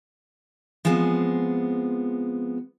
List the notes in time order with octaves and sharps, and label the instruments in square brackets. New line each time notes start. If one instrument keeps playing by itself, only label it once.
[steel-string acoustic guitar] F3 G#3 B3 C4